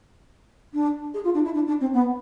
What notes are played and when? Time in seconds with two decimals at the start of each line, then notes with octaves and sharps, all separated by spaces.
0.73 D4
1.13 G#4
1.24 F4
1.33 D4
1.44 E4
1.53 D4
1.66 D4
1.80 C4
1.93 B3